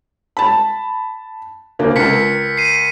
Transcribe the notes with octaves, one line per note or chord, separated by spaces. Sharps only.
A5 B5
D2 A#3
C#2 A#4 B6 C#7
C7 D#7